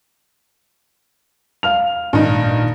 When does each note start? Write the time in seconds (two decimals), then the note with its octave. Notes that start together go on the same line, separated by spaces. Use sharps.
1.63 F5 F6 F7
2.13 G#1 G2 A#2 D#4